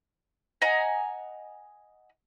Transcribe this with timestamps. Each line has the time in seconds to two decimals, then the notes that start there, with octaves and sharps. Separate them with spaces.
0.62 D#5 F#5 G#5 A#5